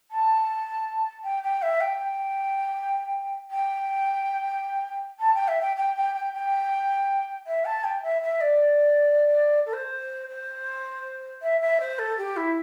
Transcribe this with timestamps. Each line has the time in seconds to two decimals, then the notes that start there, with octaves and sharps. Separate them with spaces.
0.11 A5
1.24 G5
1.43 G5
1.62 E5
1.80 G5
3.50 G5
5.19 A5
5.34 G5
5.48 E5
5.61 G5
5.76 G5
5.96 G5
6.14 G5
6.33 G5
7.47 E5
7.65 A5
7.84 G5
8.02 E5
8.22 E5
8.41 D5
9.66 A4
9.73 C5
10.29 C5
11.42 E5
11.61 E5
11.80 C5
11.98 A4
12.17 G4
12.36 E4